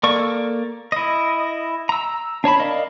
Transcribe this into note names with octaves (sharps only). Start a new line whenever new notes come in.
A#3 A4 D5 C#6
E4 D#5
A#5 E6
D4 C#5 A5 B5
A#4 D5 D#5 F5